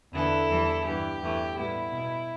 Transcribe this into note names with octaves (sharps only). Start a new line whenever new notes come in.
E2 D3 B3 E4 A4
E2 E3 G3
G2 E3 B3 G4
E2 E3 A3
A2 G3 B3 E4
B2 B3